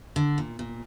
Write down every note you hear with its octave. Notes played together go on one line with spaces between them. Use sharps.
D3
A#2
A#2